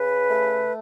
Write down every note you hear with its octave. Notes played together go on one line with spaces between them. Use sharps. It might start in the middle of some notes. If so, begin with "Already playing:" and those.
Already playing: C#3 B4
A3